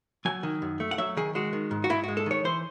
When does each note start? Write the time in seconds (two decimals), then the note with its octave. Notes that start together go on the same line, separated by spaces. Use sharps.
0.25 F#3 G#5
0.43 D#3
0.62 F#2
0.80 A3
0.91 F#5
0.98 F#3 E5
1.17 D#3 G#4
1.35 G#3 F#4
1.53 D#3
1.71 G#2
1.84 F#4
1.90 G#2 E4
2.04 F#4
2.08 G#3
2.17 A4
2.26 D#3 C#5
2.44 E3 C5